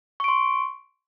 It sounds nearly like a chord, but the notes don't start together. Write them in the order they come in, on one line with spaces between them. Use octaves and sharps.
C#6 D7 C6